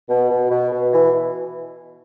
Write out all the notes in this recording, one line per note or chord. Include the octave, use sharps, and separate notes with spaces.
B2
B2
B2
B2
E3